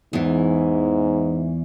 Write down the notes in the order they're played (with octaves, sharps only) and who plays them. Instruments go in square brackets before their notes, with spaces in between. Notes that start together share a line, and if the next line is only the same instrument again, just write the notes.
[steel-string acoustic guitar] E2 E3 [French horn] G#2